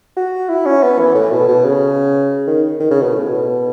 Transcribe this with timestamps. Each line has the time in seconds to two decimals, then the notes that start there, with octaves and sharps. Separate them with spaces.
0.17 F#4
0.49 E4
0.66 C#4
0.83 B3
0.99 E3
1.15 A2
1.32 B2
1.48 B2
1.65 C#3
2.47 D#3
2.80 D#3
2.91 C#3
3.02 B2
3.13 A2
3.29 B2